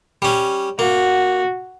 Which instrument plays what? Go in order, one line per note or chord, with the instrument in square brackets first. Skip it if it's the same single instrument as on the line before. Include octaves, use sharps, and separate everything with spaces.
[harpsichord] G3 C#4
[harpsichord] A#3 [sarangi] F#4